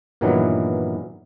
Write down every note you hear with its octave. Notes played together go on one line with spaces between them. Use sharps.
G2 A#2 D#3 E3 F#3 B3